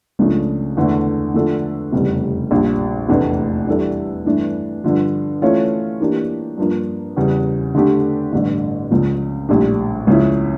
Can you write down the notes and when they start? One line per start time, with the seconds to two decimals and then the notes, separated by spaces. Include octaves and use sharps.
0.19 C#2 C#3 F3 A3 D4
0.77 E2 D3 A3
1.34 D3 F3 A3 D4 A4
1.92 F1 E2 C#3 G3
2.51 A#1 A#2 G3 D4 F4
3.09 F1 E2 E3 A3 D4
3.67 E3 G3 D4 A4 D5
4.25 G2 E3 A3 D4
4.84 G2 D3 F3
5.42 E3 A3 C#4 F4 C#5
6.00 E3 A#3 D4 G4
6.58 G2 F3 A#3 D4
7.17 E2 C#3 G3
7.75 D3 A3 D4 G4
8.33 A1 G2 D3
8.91 C#2 C#3 F3
9.49 A#1 A2 G3 D4 G4
10.07 C#2 C#3 F3 C#4 E4